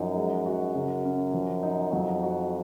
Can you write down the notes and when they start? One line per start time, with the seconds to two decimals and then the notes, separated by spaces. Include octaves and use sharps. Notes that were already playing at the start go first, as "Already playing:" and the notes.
Already playing: F#2 F3 D#4
0.16 G#3
0.46 F#4
0.75 F#2 C#3
1.05 C#4
1.34 F3
1.63 D#4
1.93 F2 F#3
2.23 F#4